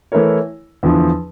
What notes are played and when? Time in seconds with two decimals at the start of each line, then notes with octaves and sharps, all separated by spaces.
0.12 E3 A3 E4 A#4 C#5
0.83 E2 D3 F3